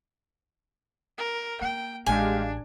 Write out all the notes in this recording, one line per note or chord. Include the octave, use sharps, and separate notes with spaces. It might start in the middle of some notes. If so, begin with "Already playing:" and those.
A#4
A#3 G5
A1 G#3 D4 G4 F5 G#5